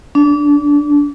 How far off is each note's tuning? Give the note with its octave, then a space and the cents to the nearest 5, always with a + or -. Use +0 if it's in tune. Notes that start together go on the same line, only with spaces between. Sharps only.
D4 -30